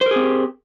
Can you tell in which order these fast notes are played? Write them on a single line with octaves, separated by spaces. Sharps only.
C5 A#4 G#4 C4 G4